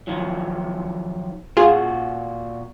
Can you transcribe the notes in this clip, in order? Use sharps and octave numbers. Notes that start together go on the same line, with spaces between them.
D#3 F3 F#3
A#2 F4 F#4 G#4